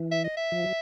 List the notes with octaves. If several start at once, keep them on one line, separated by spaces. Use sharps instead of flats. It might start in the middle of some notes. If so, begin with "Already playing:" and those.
Already playing: E3
E5
D#5
E5
F3
F#3